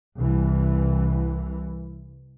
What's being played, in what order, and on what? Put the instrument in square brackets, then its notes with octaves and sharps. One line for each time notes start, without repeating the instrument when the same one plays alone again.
[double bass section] C2 E3